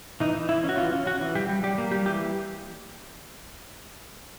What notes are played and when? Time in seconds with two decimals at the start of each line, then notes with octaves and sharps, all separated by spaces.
0.20 E3 D#4
0.35 E3
0.49 E3 E4
0.64 C#4
0.69 F#4
0.77 E3 F4
0.92 C#4
1.06 C#4 F#4
1.21 E3
1.35 G3 G4
1.49 G3
1.63 G3 G4
1.78 A#3
1.91 G3 G4
2.06 E3 G4